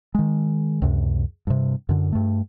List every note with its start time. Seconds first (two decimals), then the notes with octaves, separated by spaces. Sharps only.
0.15 D#3 G#3
0.82 C#2 F#2 C3
1.47 G2 C3
1.89 F#2 D3
2.12 G2 A3